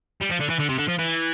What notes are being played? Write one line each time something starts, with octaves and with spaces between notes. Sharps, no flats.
G3
F3
D3
E3
D3
C3
D3
F3
E3